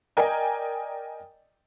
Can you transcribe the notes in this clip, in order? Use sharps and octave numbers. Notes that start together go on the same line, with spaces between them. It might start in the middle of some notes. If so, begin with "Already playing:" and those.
A#4 D5 D#5 G5 G#5 A#5